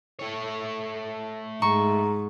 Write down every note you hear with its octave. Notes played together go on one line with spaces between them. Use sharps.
A3 C#5
G#2 A#5 C#6